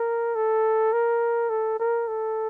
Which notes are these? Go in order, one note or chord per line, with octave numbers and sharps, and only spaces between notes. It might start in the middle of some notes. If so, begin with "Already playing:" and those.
Already playing: A#4
A4
A#4
A4
A#4
A4